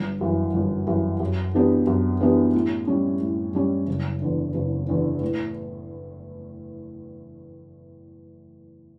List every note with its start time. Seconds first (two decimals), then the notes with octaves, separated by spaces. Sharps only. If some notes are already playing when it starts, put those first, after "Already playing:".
Already playing: G1
0.21 F#2 E3
0.54 G1
0.87 F#2 E3
1.20 F#2
1.54 E3 B3 D4 G4
1.87 F#2
2.20 E3 B3 D4 G4
2.54 A2
2.87 G3 C#4
3.20 A2
3.55 G3 C#4
3.87 F#1
4.22 E2 D3
4.55 F#1
4.88 E2 D3
5.22 A2